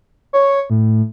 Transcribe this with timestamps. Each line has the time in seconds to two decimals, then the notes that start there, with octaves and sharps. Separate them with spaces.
0.33 C#5
0.70 A2